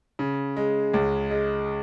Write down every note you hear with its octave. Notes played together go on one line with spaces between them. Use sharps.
C#3
G#3
C#2
G#3